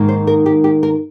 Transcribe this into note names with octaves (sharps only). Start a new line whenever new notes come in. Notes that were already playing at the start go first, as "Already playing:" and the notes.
Already playing: G#2 D#3 A#3 D#4
C5
A#4
G4
G4
A#4